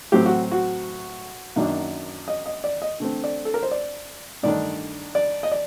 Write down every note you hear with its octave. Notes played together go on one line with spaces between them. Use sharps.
A2 F#3 C4 G4
F#4
F#4
F#2 D#3 F#3 A#3 D4
D#5
D#5
D5
D#5
D3 A3 C4
D5
A4
A#4
C5
D5
G2 D#3 A3 D4 D5
D5
D#5
D5